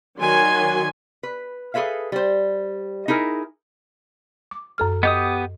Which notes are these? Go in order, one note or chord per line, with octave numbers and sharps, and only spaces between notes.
D#3 F#3 F#4 D5 G#5 C6
B4
G#4 A4 B4 E5 F5
G3 C5
D#4 E4 G#4 A#4
D6
F#2 A4 F6
B3 G4 D#5 D#6